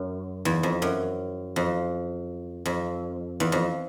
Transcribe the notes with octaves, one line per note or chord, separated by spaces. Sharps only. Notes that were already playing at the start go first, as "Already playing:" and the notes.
Already playing: F#2
E2
F2
F#2
F2
F2
E2
F2